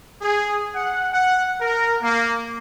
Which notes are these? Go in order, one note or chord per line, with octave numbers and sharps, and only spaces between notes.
G#4
F#5
F#5
A#4
A#3